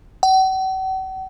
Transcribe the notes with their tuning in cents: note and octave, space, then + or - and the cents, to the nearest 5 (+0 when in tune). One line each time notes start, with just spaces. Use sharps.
F#5 +45